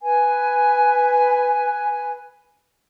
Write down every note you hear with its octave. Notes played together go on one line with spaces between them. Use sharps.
B4 G#5